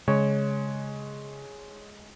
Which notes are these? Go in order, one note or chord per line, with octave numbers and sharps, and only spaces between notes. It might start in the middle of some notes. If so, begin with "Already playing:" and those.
C#3 G#3 C#5